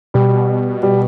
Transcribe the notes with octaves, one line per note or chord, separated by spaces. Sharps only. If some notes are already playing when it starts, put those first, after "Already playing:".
B2 G3
G3